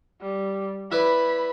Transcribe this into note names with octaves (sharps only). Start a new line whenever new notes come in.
G3
E4 B4 D5 B5